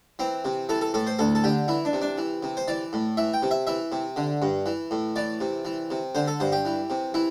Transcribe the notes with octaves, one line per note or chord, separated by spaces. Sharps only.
E3 C4
C3
E3 A4
A4
A2 A4
C5
D2 A4
A4
D3 G4
E3 E4
D4
C3
D4
E3
C3
C5
E3 D5
A2
E3 E5
G5
C3
E5
E3 E5
C3
D3
G2
E3
A2
E3 D5
C3
E3
C3
D3 C5
A4
G2 C5
G4
E3
C3
E3 E4